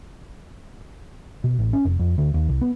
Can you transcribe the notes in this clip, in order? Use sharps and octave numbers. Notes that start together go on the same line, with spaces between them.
B2
A1
C#4
F1
F2
D2
D#2
C2
B3